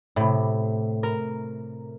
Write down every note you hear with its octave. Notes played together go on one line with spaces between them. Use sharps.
A2 C3
A#4